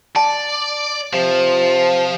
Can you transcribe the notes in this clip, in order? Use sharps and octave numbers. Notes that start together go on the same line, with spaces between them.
D5 A5
C3 F3